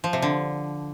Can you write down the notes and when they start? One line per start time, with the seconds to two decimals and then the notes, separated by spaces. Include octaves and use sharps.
0.04 F3
0.13 C3
0.22 D3